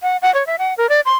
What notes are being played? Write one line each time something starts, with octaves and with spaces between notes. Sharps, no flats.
F#5
F#5
C#5
E5
F#5
A#4
D5
C6